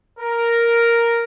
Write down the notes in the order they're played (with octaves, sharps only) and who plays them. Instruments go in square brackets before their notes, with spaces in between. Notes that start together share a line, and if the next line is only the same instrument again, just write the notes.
[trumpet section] A#4